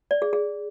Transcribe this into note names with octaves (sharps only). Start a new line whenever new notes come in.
D5
G#4
G#4